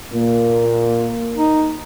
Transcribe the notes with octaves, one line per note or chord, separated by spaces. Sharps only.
A#2 A#3
D#4